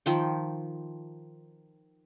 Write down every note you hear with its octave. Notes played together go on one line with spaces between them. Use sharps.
D#3 F3 G5